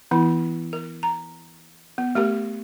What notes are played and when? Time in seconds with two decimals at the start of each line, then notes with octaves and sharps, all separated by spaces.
0.11 E3 B3 E4
0.73 A#4
1.03 A#5
1.98 B3
2.15 A3 G4 A#4